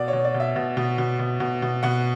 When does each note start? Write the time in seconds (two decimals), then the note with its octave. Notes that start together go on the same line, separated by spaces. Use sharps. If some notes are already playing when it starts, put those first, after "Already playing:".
Already playing: B2 D5
0.08 C#5
0.13 B2
0.25 D5
0.34 B2
0.40 E5
0.56 B2
0.77 B2
0.98 B2
1.19 B2
1.40 B2
1.62 B2
1.83 B2 F#5